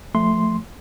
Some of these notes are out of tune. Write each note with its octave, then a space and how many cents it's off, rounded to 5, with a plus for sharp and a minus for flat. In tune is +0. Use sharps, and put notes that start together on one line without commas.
F3 +0 A3 +0 C6 +0